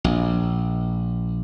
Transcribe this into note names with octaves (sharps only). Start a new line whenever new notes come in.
A#1